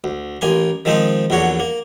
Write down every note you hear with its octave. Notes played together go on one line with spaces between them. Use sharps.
D2
A1 A#3 G#5 C6
D#3 F3 G#3 C4 D#4
A#1 E2 D3 F#4 C#5
A#3